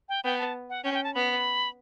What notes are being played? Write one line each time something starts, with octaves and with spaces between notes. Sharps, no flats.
G5
B3 G5
A5
F#5
C#4 G5
G5
A5
B3 B5